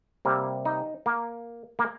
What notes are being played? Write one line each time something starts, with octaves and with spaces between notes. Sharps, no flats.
C3 G3 A#3
D#4
A#3
A#3